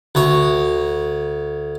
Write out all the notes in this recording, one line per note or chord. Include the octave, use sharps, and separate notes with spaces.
D2 C#5